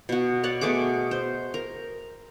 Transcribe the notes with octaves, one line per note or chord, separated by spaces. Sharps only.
B2 F#4
C#5 D5 F#5
B2 A3 G#4 D6
C5
A#4